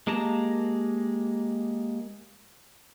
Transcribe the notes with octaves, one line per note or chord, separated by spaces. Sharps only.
G#3 A#3 G4 A5 A#5